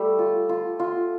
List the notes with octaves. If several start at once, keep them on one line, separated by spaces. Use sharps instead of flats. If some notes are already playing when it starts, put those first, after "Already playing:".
Already playing: G3 A3 G4 A4
F4
F4
F4